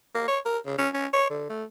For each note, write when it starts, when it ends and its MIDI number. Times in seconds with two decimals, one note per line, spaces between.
0.15 0.24 58
0.28 0.39 73
0.45 0.58 70
0.66 0.77 49
0.78 0.89 61
0.94 1.07 61
1.13 1.28 73
1.30 1.47 50
1.49 1.64 57